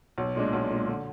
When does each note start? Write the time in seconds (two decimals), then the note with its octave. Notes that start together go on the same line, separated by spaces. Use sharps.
0.18 B1
0.35 A#2 G#3 D4
0.53 B1
0.70 A#2 G#3 D4
0.87 D3